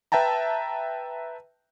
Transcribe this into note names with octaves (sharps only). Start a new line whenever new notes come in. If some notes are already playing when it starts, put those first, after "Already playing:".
B4 E5 G5 A5 A#5